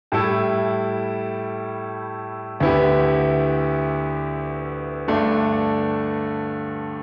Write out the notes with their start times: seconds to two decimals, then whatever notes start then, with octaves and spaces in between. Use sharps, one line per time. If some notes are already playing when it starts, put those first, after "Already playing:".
0.12 A2 G3 E4 A4
2.60 D2 D3 B3 E4 G4
5.08 G2 D3 A3 D4